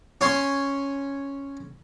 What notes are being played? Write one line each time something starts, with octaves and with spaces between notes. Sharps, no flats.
C#4 C#5 G#5 C6